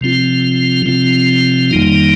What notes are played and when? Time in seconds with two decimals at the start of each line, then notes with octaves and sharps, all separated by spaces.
0.01 C3 F3 C4 F4
0.86 C3 F3 C4 F4
1.71 F2 D#3 G3 A#3 D#4